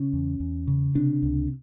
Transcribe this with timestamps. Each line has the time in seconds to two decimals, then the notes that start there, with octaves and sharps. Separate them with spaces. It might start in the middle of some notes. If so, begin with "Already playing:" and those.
Already playing: C#3 C#4
0.13 E2
0.40 E2
0.67 C#3
0.95 C3 D4
1.23 C#2